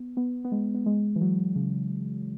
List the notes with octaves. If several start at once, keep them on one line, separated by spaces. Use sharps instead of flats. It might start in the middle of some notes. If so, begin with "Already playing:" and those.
Already playing: B3
B3
B3
G#3
B3
G#3
E3
F#3
C#3